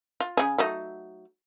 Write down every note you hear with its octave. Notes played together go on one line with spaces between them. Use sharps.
F4
C#3 G#4
F#3 A3 D#4